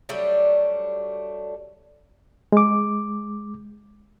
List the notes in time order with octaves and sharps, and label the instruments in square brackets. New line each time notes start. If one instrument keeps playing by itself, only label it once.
[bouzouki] F#3 G3 A3 D4
[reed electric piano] G#3 D6